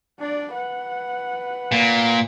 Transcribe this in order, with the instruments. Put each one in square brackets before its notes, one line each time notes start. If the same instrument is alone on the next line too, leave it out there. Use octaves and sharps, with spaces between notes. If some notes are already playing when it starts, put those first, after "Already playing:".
[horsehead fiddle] D4 D5
B4 F#5
[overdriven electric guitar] A#2